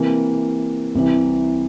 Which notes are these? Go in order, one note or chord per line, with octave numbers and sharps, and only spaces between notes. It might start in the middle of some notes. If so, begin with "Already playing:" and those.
Already playing: C3 E3 A#3
C2 C3 E3